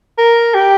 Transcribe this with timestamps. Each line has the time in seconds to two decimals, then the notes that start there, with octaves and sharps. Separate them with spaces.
0.18 A#4
0.54 G4